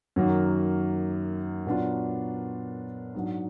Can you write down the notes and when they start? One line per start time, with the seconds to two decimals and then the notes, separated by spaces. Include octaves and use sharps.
0.16 F#2 D#3 F#3 A#3
1.66 A#2 F#3 B3 D4 F4
3.15 G#2 F#3 D4